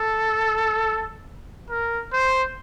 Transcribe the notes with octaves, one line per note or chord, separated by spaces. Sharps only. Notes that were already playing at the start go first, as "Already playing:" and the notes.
Already playing: A4
A#4
C5